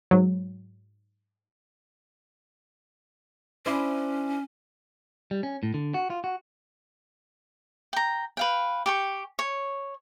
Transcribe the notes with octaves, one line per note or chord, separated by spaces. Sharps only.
G#2 F#3
C#4 D4 E4 C5
G3
C#4
A2
D3
F#4
F4
F#4
G5 A#5
B4 F5 G5
G4 G5 C#6
C#5